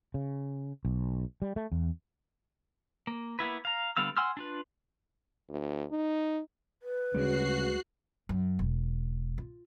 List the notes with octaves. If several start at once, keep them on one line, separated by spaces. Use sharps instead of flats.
C#3
B1
G3
A3
E2
A#3
A#3 B3 E4 B4
F5 A#5
D3 G3 B3 F5 E6
F#5 G#5 C6 E6 F6
D4 F4 B4
D2
D#4
B4
D2 C#3 G3 G#3 F#4 F#6 C7
F#2
E1
F4